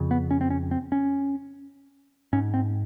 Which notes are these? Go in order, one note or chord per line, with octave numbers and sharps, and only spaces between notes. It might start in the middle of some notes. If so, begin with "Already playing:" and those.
Already playing: F2 C#3
B3
C#4
C4
C#4
C4
C#4
G#2 C#4
C4